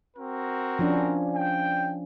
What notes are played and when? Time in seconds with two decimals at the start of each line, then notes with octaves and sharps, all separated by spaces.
0.16 C4 F#4 A#4
0.79 F3 C#4 D4
1.34 G5